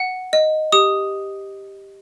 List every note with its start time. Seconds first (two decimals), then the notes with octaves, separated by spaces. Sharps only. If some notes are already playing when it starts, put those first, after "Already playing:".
Already playing: F#5
0.33 D#5
0.72 G4 D#6